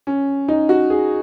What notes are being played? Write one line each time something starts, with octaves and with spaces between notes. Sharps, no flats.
C#4
D#4
F#4
G#4